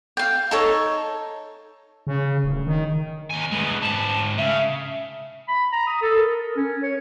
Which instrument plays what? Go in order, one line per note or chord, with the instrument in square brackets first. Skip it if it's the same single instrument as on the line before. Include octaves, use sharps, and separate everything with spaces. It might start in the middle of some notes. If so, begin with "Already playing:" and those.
[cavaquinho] F5 G5
D#4 A4 C#5
[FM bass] C#3
D1
D#3
[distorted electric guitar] D#2 G#5
G#3 B3
G#2 A5
[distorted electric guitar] C#3 [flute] E5
[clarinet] B5
A#5
D#6
A4
A#4
C#4
C#5